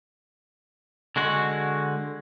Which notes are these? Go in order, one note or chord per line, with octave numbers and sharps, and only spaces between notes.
D3 G#3 F#4